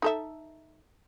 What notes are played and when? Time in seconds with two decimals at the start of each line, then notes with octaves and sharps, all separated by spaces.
0.02 D#4 A4 E5